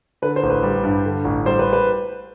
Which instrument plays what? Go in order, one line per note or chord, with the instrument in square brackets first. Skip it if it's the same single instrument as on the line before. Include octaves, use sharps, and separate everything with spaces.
[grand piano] D3 [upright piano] B4
[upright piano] C5
[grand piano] A1
[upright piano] B4
[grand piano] G3
G2
D3
A1
[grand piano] G3 [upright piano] C5
[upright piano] B4
B4